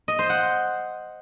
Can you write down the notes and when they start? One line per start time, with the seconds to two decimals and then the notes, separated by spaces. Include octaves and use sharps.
0.08 D#5
0.19 C5
0.29 F#5